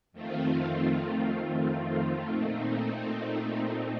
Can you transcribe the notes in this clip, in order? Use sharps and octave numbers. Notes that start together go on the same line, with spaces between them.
F2 D#3 A3 C4 F4
A#2 A3 C4 D#4